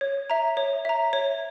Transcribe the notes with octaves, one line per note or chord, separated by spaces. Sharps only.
C#5
E5 A#5
C#5
E5 A#5
C#5